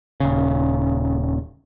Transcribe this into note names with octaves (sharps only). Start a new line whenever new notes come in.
D#1 C#3